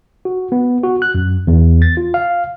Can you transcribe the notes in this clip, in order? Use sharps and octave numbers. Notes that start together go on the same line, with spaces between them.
F#4
B3
F#4
F#6
F#2
E2
A6
F4
F5